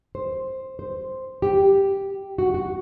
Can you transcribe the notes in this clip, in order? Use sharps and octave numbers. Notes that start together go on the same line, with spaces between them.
C5
C5
G4
F#4
F#4